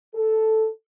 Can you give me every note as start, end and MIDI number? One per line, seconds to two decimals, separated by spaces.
0.15 0.67 69